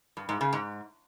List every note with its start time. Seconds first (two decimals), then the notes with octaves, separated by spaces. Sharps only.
0.17 G2
0.29 G#2
0.41 C#3
0.53 G#2